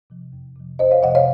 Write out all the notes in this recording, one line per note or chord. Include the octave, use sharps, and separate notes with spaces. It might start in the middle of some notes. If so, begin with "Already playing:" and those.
C3 F3
F2
C3 F3
F2 C5 D#5
C#5 F5
C3 F3 D#5 F#5
C#5 F5